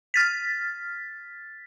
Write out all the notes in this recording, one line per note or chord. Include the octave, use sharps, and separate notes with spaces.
F6 A6 B6